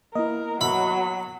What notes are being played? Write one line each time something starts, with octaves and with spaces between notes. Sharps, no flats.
A#3 B3 E4 A#4 D#5
F#3 B3 F#4 E5 B5